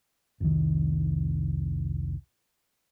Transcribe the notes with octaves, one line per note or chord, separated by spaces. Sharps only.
F1 C2 D#3